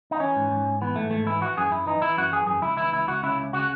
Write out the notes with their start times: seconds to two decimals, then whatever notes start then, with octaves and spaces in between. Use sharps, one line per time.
0.11 D#4
0.20 E3 C#4
0.36 G#2
0.51 G#2
0.66 G#2
0.81 E3 B3
0.96 G#2 A3
1.11 G#2 A3
1.26 E3 E4
1.41 E3 F#4
1.57 F#2 G#4
1.71 F#2 E4
1.86 E3 D#4
2.02 E3 E4
2.17 F#2 F#4
2.32 E3 G#4
2.47 F#2 G#4
2.62 C#2 E4
2.77 E3 E4
2.92 C#2 E4
3.08 C#2 F#4
3.23 C#3 E4
3.38 C#2
3.53 C#3 F#4